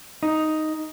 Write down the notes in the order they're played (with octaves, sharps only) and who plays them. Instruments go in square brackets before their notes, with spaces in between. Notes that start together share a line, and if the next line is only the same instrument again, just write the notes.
[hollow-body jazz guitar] D#4